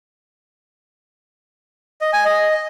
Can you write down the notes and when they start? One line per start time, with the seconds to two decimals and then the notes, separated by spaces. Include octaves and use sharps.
2.01 D#5
2.13 G#5
2.25 D#5